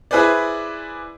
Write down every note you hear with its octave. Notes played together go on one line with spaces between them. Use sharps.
E4 G#4 B4 C5 D5